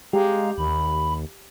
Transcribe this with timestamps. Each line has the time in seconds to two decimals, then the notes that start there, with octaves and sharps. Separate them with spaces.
0.13 G#3 G4 F5 A#5
0.58 D#2 B5